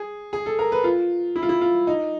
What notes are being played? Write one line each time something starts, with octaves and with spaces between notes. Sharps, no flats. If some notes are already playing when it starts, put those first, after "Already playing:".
Already playing: G#4
G#4
A4
A#4
B4
F4
E4
F4
E4
F4
D#4